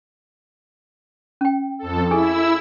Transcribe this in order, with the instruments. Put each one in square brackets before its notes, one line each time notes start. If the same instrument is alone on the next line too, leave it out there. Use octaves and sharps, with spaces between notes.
[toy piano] C#4 G5
[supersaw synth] F2 A4
[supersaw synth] E4 E6 [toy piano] G#4 A4 G#5